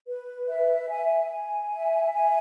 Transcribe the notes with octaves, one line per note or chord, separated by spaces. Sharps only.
B4
E5
G#5
G#5
E5
G#5